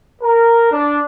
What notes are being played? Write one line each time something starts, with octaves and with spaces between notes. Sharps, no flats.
A#4
D4